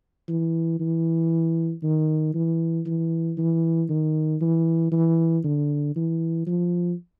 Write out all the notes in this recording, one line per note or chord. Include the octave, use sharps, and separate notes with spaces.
E3
E3
D#3
E3
E3
E3
D#3
E3
E3
D3
E3
F3